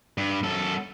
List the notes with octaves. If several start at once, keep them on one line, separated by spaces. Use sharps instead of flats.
G2
F#2 A4